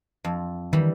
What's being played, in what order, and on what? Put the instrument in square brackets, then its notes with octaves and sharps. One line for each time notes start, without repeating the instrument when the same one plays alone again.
[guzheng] F2
[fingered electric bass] D#3 [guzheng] E3 G3